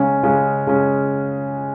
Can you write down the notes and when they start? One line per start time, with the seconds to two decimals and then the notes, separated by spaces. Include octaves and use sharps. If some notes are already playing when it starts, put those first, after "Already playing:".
Already playing: C#3 G#3 C#4
0.23 C#3 G#3 C#4
0.67 C#3 G#3 C#4